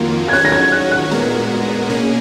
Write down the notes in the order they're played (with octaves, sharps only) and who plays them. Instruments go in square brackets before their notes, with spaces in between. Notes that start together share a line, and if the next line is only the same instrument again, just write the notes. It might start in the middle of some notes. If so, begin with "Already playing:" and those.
Already playing: [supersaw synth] F2 D#3 F#3 A#3 F4
[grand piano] G#6
[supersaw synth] D#3 F#3 C#4 F#4 C#5 [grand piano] F#6
[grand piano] A#6
G#6
F#6
F#6
[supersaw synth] A#2 G#3 B3 F#4 A#4
B2 A#3 C#4 G#4